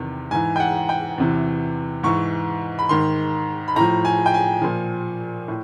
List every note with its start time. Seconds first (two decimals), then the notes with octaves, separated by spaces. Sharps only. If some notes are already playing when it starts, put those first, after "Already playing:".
Already playing: E2 C3 D#3
0.31 G#2 E3 G#5
0.56 G5
0.60 F#5
0.89 G5
1.18 E2 C3 E3
2.03 G#2 E3 C#6
2.79 B5
2.89 G#2 D#3 C6
3.68 B5
3.76 A2 F3 A#5
4.05 G#5
4.26 G5
4.34 G#5
4.62 A#2 F3
5.48 A2